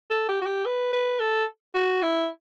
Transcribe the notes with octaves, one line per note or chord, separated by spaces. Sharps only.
A4
G4
F#4
G4
B4
B4
A4
F#4
E4